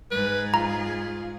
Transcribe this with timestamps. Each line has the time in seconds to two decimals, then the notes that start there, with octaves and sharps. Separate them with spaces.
0.11 G#2 G#4 B4
0.54 F4 A#5